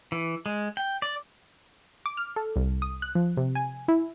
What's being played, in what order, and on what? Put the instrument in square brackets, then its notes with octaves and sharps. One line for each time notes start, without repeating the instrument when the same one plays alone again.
[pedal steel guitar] E3
G#3
G5
D5
[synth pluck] D6
F6
A4
C2
D#6
F#6
F3
C3
G#5
E4